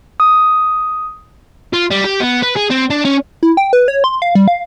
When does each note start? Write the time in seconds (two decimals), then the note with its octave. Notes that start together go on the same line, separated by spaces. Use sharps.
0.20 D#6
1.73 F4
1.91 G3
2.04 G4
2.20 B3
2.43 B4
2.57 G#4
2.71 C4
2.90 D4
3.05 C#4
3.43 E4
3.57 G5
3.73 B4
3.88 C#5
4.04 C6
4.22 F5
4.35 G3
4.48 F5